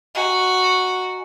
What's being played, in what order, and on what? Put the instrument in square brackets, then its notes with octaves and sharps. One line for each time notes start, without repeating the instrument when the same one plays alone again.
[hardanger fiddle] F#4 [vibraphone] D#5 G#5 A#5